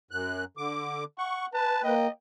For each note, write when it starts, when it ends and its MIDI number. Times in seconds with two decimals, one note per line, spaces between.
0.11 0.44 42
0.11 0.44 90
0.57 1.04 50
0.57 1.04 86
1.18 1.48 78
1.18 1.46 85
1.53 1.94 71
1.53 1.84 81
1.84 2.07 58
1.84 2.10 75
1.84 2.07 79